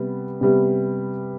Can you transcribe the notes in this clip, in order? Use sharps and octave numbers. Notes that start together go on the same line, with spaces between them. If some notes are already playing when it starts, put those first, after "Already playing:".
Already playing: C3 G3 B3
C3 G3 B3